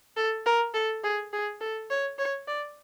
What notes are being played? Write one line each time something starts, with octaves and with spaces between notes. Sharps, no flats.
A4
A#4
A4
G#4
G#4
A4
C#5
C#5
D5